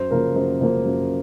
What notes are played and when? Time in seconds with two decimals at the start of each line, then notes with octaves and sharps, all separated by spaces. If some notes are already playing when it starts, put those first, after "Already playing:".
Already playing: F#2 C5
0.11 C#3 F3 A#3 A#4
0.36 F#2 C5
0.61 C#3 F3 A#3 C5
0.85 F#2